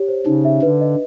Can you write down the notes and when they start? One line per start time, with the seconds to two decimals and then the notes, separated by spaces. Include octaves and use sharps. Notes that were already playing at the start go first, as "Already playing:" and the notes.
Already playing: G4 C#5
0.08 C5
0.26 C#3 D#4
0.45 E5
0.62 D3 B4
0.81 D#5